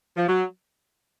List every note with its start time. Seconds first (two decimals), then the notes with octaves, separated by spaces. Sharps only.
0.16 F3
0.28 F#3